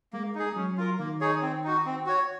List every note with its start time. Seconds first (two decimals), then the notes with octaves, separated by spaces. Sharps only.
0.13 G#3 A#3
0.35 D#4 G#4
0.56 F#3 C#4
0.77 F4 A#4
0.99 D#3 A#3
1.20 D#4 G#4 C#5
1.42 C4
1.64 D#4 F#4
1.85 C4
2.06 F#4 C#5